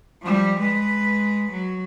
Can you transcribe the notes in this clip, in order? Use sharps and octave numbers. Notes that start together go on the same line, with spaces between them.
F3 G3
G#3 B4
F#3